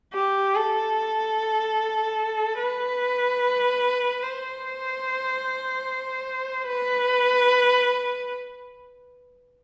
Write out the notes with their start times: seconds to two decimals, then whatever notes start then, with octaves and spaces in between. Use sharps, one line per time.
0.14 G4
0.55 A4
2.59 B4
4.22 C5
6.67 B4